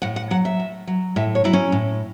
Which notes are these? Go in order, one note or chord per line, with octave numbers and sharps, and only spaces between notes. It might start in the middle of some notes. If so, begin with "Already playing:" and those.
A2 F#5
F#5
F#3 F#5
E5
A2
F#3
A2 E5
C#5
F#3 E4
C#4
A2